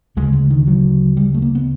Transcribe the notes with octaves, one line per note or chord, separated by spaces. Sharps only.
D2 C#3 G#3
G#3
D#3
F#3
G3
A3
A#3
B3